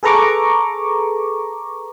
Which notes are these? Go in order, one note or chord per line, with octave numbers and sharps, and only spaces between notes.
G#4 A4 B4 A#5 C#6 D6